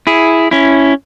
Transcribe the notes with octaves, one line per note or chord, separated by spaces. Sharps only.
E4 G#4
C#4 E4